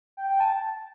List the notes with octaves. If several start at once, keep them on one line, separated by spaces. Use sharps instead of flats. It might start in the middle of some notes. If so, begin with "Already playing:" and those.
G5
G5
A5